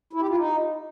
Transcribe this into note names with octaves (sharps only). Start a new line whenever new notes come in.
E4
G4
F4
D#4